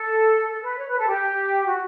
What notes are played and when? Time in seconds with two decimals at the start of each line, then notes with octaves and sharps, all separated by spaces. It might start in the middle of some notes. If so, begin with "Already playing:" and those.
Already playing: A4
0.48 A4
0.62 B4
0.77 C#5
0.87 B4
0.98 A4
1.07 G4
1.66 F#4